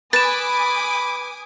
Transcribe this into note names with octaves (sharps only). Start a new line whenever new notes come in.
B4 G#5 B5 D6 D#6 A6 E7